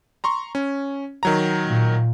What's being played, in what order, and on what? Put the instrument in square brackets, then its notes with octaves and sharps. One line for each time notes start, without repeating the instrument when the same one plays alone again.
[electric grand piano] A#5 C6 C#6
C#4
D#3 F#3 A#5
[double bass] A#2